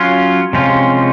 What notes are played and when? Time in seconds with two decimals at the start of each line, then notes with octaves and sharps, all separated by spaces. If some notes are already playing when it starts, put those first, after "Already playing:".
Already playing: F#3 C#4 F4
0.53 C3 F3 G#3 C#4 F4